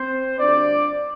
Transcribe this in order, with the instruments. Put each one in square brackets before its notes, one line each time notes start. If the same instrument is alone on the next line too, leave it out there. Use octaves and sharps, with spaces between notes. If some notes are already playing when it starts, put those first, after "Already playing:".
Already playing: [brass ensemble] C4 C5
D2 D3 G3 D4 F4 D5